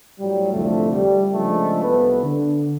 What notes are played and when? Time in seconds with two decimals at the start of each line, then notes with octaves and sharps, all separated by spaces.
0.19 A2 F#3 G3
0.52 C2 F2 D3 A3
0.92 G3
1.32 C#3 F3 G#3 A3 D4
1.82 C2 B3 A4 B4
2.22 D3